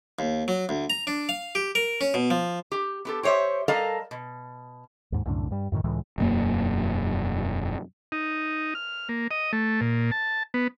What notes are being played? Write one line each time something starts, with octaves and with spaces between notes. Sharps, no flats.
D#2
F#3
D2
A#5
D4
F5
G4
A#4
C#4
B2
F3
G4
B3 G4 A4
G4 C5 C#5 D#5 E5
G3 A4 A#4 D#5 F5
B2
D#2 G#2
C2 F#2 A2 D3
G2 G3
F#2 A2 D3 D#3
C#2 A2 E3 G#3
E1 F#2 A#3
D#4
F6
A#3
D#5
A3
A#2
A5
B3